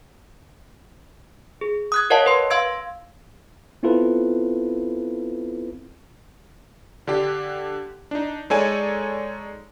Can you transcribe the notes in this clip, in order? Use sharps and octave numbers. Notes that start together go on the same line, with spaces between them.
G#4
D#6 F#6 G#6
A#4 C#5 D#5 F5 F#5 A5
B4 C6
F5 C6 E6 G#6 D7
B3 C4 E4 F4 A4 B4
D3 D4 G4
D4 D#4
G#3 D#4 A4 C#5 D5 G#5